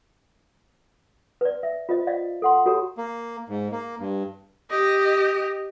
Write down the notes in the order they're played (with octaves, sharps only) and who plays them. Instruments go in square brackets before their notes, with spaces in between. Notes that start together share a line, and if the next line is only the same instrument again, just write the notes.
[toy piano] B4 D5
E5
F4 C5 D#5
D5 D#5 F5
A4 F#5 C6
F#4 G4 A4 C#5 A#5
[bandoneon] A#3
G#2
A#3
G2
[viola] G4 D#5